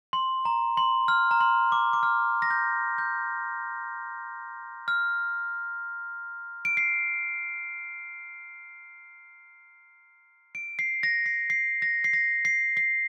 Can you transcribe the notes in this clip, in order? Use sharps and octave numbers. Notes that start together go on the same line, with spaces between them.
C6
A#5
C6
F6
A#5
C6
D6
D6
F6
A#6
G6
G6
F6
D7
C7
D7
C7
A#6
C7
C7
A#6
C7
A#6
C7
C7